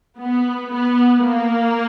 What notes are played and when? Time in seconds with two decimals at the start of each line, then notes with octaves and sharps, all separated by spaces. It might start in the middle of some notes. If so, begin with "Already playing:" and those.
0.17 B3
0.72 B3
1.25 A#3